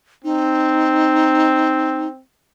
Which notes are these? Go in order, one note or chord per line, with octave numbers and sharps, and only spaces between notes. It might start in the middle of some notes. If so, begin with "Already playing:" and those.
C4 D#4